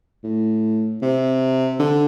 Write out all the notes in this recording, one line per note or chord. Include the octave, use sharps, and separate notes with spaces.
A2
C3
D3